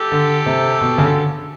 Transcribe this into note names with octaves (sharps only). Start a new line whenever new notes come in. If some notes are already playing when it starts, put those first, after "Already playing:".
Already playing: G4 A4
D3
C3
B2
C#3
D3